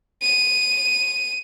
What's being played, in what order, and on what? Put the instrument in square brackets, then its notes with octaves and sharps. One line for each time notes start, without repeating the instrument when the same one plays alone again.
[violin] D#7